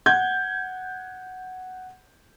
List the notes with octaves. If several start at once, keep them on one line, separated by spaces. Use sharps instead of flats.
F#5 G6 G#6